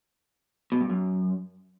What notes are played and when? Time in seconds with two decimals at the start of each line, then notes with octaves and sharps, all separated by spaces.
0.72 B2
0.81 G2
0.89 F#2